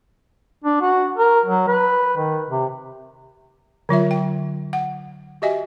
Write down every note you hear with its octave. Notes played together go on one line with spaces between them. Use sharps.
D4
F#4
A#4
F#3
B4
D#3
C3
D3 F#3 F4 E5
G5
F#5
F#4 G4 D#5 E5 G#5